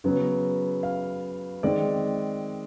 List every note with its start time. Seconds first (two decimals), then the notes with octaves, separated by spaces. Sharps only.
0.04 C#3 F#3 B3
0.83 F5
1.63 D#3 G#3 C4 D5